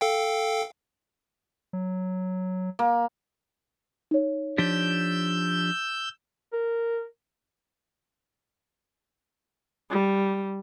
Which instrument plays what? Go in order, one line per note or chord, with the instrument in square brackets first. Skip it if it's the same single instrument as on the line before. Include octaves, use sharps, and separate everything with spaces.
[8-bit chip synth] A4 F5 G5
[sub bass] F#3
[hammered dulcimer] A#3
[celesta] D#4 C#5
[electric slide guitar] F3 D4 G4 [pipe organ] E6 G6
[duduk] A#4
[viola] G3